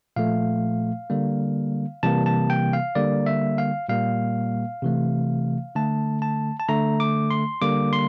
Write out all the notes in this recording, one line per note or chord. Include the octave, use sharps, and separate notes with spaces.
A#2 F3 A3 F5
D3 G3 A#3
C3 E3 G3 A#3 A5
A5
G5
F5
D3 G3 A#3 D5
E5
F5
A#2 G3 A#3 F5
C3 E3 A3
D3 A3 A5
A5
A5
D3 A3 A#5
D6
C6
D3 G3 A#3 D6
C6